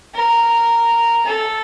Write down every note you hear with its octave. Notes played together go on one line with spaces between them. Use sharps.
A#4
A4